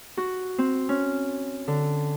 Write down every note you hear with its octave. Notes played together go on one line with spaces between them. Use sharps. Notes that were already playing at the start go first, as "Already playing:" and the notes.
F#4
C4
C#4
D3